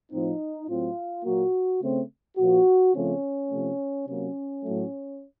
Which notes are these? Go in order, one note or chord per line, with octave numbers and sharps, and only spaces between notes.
A2 F3 C4 D#4
A2 F#3 C4 F4
A#2 F#3 A#3 F#4
C#3 A3 C4
A#2 F3 A#3 F#4
C#3 F3 A3 C4 C#4
C3 F3 A3
C3 F#3 A#3 C#4
A2 F#3 A3